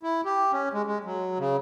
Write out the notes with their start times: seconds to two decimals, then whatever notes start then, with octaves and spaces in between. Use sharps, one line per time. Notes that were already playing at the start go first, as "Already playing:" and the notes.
0.03 E4
0.25 G4
0.53 C#4
0.73 G#3
0.86 G#3
1.04 F#3
1.39 C#3